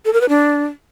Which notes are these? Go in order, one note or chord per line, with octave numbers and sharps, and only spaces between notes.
A4
A#4
B4
D4